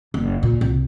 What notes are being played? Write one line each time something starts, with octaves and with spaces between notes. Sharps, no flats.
F#1
A#2
C2